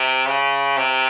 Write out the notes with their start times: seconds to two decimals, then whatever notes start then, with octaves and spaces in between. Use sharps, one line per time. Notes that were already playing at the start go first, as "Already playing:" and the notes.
Already playing: C3
0.27 C#3
0.77 C3